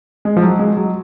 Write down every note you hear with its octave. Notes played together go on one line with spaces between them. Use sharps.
G#3
F3
F#3
G#3
F#3